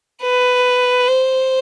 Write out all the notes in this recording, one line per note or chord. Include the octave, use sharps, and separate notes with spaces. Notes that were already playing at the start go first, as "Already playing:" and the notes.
B4
C5